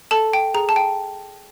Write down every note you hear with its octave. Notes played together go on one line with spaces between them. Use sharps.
A4 A5
G5
G#4 A#5
A5
G5